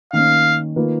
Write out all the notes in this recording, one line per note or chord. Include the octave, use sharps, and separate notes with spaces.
D#3 A#3 C#4 F5
D#3 A#3 F4 B4